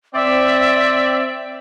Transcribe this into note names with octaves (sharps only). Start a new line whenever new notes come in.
C4 D5 E5